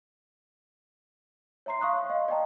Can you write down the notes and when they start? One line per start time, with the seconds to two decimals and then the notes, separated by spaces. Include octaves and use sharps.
1.66 C#5 E5 A#5 C6 C7
1.81 F5 C6 C#6 D#6 F#6
2.09 D#5 F5
2.28 D5 D#5 F5 G5 A5 A#5